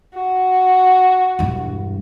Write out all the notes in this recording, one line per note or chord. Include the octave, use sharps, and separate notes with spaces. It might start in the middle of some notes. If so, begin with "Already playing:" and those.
F#4
E1 G2